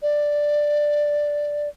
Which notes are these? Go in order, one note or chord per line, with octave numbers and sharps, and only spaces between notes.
D5